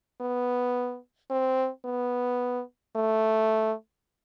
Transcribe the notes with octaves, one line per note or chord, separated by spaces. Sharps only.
B3
C4
B3
A3